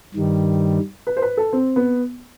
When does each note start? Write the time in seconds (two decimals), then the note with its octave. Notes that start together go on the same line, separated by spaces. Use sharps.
0.15 G2 D#3 G3
1.07 B4
1.17 C5
1.22 B4
1.37 A4
1.53 C4
1.76 B3